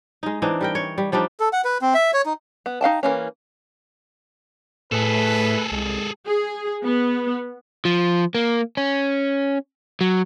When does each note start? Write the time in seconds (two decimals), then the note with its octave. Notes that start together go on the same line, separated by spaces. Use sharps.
0.23 G#3 D#4
0.42 E3 C4 D4 D#4
0.61 G3 A#4 G5
0.75 C#5
0.98 G3
1.12 F3 G3 D4 D#4
1.40 A4
1.53 F#5
1.65 B4
1.82 C4
1.95 E5
2.14 C#5
2.26 D#4
2.66 B3
2.81 D#4 F5 G5 A5
3.03 E3 A#3 C#4
4.92 A2 A3 G#4 A4 B4
5.72 C2 G#3
6.28 G#4
6.84 B3
7.85 F3
8.35 A#3
8.77 C#4
10.01 F#3